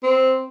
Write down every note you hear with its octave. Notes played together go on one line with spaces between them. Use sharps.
C4